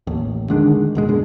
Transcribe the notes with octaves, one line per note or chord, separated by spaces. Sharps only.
A1 D#2
D3 D#3 G#3 D4
D1 B2 G#3
F#2 B2 D3 G#3